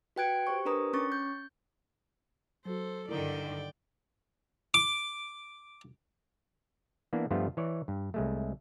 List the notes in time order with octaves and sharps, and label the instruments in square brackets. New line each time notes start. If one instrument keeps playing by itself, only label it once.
[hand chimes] F#4 B4 G5 F#6 G#6 D7
G4 C5 C#6
D4 A#4 B4 A#5 D#6
C#4 C#6 A6
G6
[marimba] F#3 F#4 [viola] A4 C5
[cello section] G2 D3 D#3 [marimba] E4 A#4 A#5 [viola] D5 G5
[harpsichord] D6
[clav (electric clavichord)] E3 A#3 B3 D4 E4
G2 F3 G3 A3 B3 F4
E3 C#5 D5
G2
C2 G#3 A3